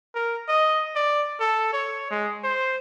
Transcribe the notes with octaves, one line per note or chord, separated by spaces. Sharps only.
A#4
D#5
D5
A4
C#5
G#3
C5